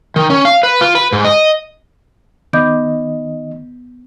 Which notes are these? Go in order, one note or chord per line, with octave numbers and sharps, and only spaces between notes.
D#3
C#4
F5
B4
F4
B4
G#2
D#5
D#3 B3 D#5 D6 G6